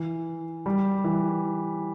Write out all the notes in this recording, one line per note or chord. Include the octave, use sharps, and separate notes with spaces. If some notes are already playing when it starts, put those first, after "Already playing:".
Already playing: E3
G3
E3